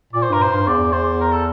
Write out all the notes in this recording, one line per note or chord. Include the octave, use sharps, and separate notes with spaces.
A#2 D5
C5
G2 A#4
C5
G2
E2 D5
E2 C5
A#4
A4